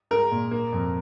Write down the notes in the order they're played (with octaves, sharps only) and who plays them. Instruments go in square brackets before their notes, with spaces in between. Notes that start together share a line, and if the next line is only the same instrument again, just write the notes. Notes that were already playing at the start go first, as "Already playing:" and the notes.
[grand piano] G#3 A#4
A#2
A#3
F2